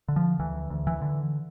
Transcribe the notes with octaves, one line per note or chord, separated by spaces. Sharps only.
D3
F3
D2 E3
D2
E3
D3